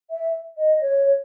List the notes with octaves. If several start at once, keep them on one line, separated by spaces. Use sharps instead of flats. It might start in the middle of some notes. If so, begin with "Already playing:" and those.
E5
D#5
C#5